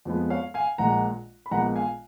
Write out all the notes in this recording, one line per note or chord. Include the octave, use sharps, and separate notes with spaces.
F2 F3 G#3 B3
C#5 F5
F5 G#5
A#1 A#2 G#3 F#5 A#5
B5
A#1 A#2 G#3 B3 F#5 A#5
F5 G#5